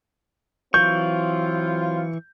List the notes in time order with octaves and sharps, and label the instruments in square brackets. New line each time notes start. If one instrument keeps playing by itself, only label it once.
[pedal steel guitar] E3 C#6 [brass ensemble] F#3 C4 F4 [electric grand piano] G6